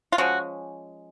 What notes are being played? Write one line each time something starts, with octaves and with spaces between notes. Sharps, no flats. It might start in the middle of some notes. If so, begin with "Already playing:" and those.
F4
F3 G#3 C#4 F#4